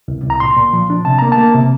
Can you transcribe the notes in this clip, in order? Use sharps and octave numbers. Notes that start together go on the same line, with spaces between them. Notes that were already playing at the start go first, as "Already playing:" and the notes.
C2
C2
A#5
A#2 C6
A#2
F3
D4
C3 A5
A#3 A#5
A5
A#3
C3